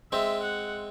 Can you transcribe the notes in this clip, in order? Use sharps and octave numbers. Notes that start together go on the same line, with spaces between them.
G#3 C4 E5
F#5